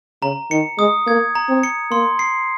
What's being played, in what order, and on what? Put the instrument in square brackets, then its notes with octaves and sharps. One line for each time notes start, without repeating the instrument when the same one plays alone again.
[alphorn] C#3 [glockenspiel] A#5
[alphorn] D#3 [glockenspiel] C#7
[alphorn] G#3 [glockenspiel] D#6
[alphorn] A#3 [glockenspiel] G#6
[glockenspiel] A#5
[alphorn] C4
[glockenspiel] C#7
[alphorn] A#3 [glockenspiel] C6
[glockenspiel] C7